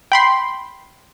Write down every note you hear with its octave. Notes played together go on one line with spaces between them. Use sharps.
G5 B5 C6